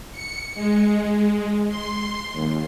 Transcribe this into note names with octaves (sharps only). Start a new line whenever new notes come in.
C#7
G#3
C6
D#2